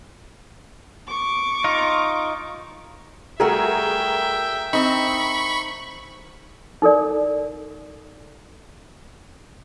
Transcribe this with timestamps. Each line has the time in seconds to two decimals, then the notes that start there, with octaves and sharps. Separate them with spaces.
1.08 C#6 D6
1.64 D#4 F4
3.40 G3 A3 F#4 G#4 A#4 E5 G5
4.73 C4 D#4 B5 C#6
6.82 D#4 A4 A#4 D5